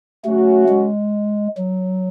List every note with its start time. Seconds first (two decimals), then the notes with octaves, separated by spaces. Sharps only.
0.25 C#3 F#3 A3 C#4 F#4
0.68 G#3
1.57 F#3